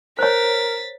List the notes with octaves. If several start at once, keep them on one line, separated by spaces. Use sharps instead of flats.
A#4 C5 C#5 A6 B6